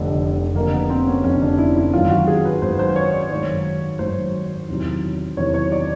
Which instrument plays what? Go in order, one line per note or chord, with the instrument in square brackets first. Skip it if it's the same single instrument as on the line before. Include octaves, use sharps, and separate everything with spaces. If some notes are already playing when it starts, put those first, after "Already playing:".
Already playing: [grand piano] F1 F2 D3 [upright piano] B3
[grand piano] F1 F2 D3 [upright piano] A#3
[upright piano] B3
C4
C#4
[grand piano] F1 F2 D3 [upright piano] C#4
[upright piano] D4
E4
E4
[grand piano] G#1 F#2 D#3 F#3 [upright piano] F4
[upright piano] F#4
G#4
B4
[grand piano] G#1 F#2 D#3 F#3 [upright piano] C5
[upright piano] C5
C#5
D5
[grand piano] G#1 F#2 D#3 F#3 [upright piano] C#5
[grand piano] G#1 F#2 D#3 F#3 [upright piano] C5
[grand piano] E2 C3 D#3 F#3
[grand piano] E2 C3 D#3 F#3 [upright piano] C#5
[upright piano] C#5
D5